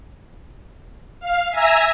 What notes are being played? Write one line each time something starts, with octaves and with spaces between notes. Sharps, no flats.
F5
E5 G#5 A#5 E6